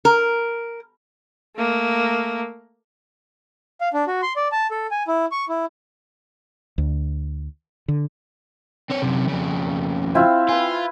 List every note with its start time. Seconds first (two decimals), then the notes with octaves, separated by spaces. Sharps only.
0.05 A#4
1.57 A3 A#3
3.81 F5
3.94 D4
4.08 F#4
4.22 C6
4.36 D5
4.52 A5
4.71 A4
4.91 G#5
5.08 E4
5.32 C#6
5.49 E4
6.78 D2
7.88 D3
8.90 C4 C#5
9.02 F#2 C3
9.28 F2 C#3
10.15 C4 E4 F4
10.49 F4 B4 G#5